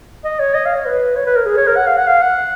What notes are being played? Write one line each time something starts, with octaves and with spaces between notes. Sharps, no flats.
D#5
C#5
D#5
F5
C#5
B4
C#5
B4
A#4
G#4
C#5
A#4
F#5
F5
F#5
F5
F#5